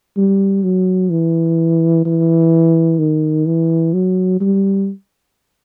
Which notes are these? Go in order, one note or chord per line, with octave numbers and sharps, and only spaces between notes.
G3
F#3
E3
E3
D#3
E3
F#3
G3